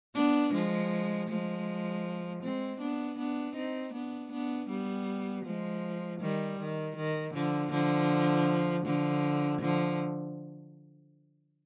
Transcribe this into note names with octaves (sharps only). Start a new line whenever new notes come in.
B3 D4
F3 G#3
F3 G#3
G#3 C4
B3 D4
B3 D4
C4 D#4
B3 D4
B3 D4
G3 B3
F3 G#3
D#3 G3
D#3
D#3
D3 F3
D3 F3
D3 F3
D3 F3